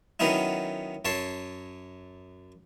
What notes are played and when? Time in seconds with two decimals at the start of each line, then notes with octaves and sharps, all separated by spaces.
0.20 D#3 F#3 B3 C#4 D#4 E4
1.05 F#2 C#5 A5 C6